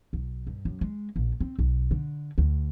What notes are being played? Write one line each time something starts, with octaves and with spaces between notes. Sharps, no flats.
B1
G2
F#2
G#3
A#1
C4
B1
D3
D2